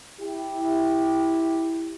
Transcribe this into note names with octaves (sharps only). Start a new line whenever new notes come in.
E4 G4